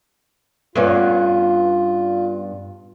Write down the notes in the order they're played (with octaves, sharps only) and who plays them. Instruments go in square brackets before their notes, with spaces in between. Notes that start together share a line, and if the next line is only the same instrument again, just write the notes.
[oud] G2 B3 C#4 [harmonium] F4